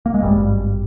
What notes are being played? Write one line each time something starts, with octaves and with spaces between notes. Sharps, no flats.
A#3
G#3
G#1 G2 G3